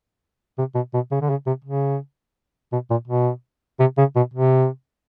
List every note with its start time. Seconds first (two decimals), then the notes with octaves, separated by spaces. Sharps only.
0.58 C3
0.75 B2
0.94 B2
1.12 C#3
1.22 D3
1.30 C#3
1.47 C3
1.65 C#3
2.72 B2
2.91 A#2
3.08 B2
3.80 C3
3.98 C#3
4.16 B2
4.34 C3